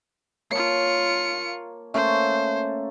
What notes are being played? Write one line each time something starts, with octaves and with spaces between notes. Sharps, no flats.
A#3 F4 C#5 A5 C#7
A3 A#3 C#4 C5